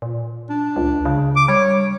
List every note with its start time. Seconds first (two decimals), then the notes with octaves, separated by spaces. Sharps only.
0.02 A#2
0.50 D4
0.76 C#2
1.05 C#3
1.36 D6
1.48 G3 C#5